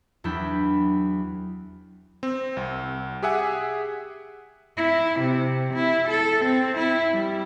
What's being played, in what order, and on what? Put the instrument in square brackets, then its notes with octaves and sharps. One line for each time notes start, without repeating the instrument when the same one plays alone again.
[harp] E2 F#3 D4 E4 G5 B5
[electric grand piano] C4
C2
G4 G#4 E5 F#5 G#5
[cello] E4
C3
E4
A4
C4
E4
G3